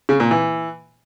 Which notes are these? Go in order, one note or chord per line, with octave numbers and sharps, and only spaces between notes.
C#3
A#2
E3